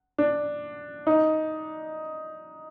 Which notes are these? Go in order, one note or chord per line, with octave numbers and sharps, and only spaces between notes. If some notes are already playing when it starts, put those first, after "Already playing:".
D4
D#4